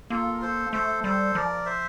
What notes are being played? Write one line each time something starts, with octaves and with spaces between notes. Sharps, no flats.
A#3 F4 A4
A#4
A4 C5
A3 A4 C5
G3 A4 C5
F3 A#4 D5
C5 E5